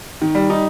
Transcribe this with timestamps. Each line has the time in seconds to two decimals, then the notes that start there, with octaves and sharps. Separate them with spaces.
0.22 D#3
0.35 G3
0.50 D#4